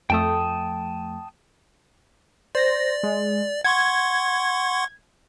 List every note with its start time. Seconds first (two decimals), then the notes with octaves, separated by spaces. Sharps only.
0.10 F2 A3 G5 A5 D#6
2.55 C5 D5 A#6
3.03 G#3
3.64 F#5 C6 C#6 G#6